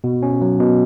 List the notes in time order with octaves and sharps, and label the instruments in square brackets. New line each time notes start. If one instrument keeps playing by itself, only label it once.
[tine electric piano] B2
C#4
F#3
B2